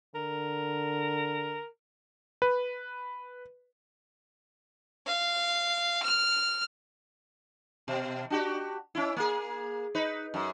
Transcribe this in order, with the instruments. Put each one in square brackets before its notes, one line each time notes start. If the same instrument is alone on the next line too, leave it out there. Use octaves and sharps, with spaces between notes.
[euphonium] D3 [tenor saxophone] A#4
[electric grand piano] B4
[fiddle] F5
F6
[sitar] B2
D4 F#4 G4
C#4 E4
A#3 G#4
D#4 B4
F#2